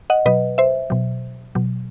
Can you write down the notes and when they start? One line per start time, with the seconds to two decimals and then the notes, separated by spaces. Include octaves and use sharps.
0.10 D#5 F#5
0.26 B2 F#3 B4 D#5
0.58 C5 E5
0.90 B2 F#3
1.55 B2 F#3